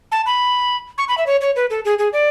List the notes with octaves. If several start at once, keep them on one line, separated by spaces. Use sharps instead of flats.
A5
B5
C#6
B5
E5
C#5
C#5
B4
A4
G#4
G#4
D5